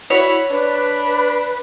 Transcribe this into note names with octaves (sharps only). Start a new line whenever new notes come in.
E4 F#4 C#5
D4 B4